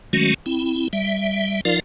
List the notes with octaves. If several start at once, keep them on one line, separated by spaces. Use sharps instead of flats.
D#3 F#3 G#3 A3 C#4 F#4
C4 E4
G3 E5
F3 D#4 F4 A#4 D5 F5